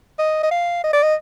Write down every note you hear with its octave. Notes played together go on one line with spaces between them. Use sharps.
D#5
D#5
F5
D#5
D5
D#5